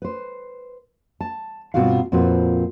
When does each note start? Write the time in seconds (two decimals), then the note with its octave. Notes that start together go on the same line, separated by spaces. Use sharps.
0.02 B4 C5
1.21 A5
1.74 G2 B2 C4 F4 F#4 F5
2.12 F2 A#2 C4 F4 F#4 B4